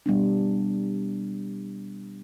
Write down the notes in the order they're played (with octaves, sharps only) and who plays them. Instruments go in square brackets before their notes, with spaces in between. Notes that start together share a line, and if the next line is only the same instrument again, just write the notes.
[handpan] B2 G3 B3 D4